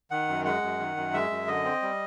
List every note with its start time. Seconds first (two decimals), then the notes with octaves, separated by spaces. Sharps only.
0.11 D#3 F#5
0.28 F#2
0.45 G#3 F#5
0.62 F#2
0.79 D#3
0.96 F#2
1.13 G#3 E5
1.30 F#2
1.47 D3 D#5
1.64 C4
1.82 G3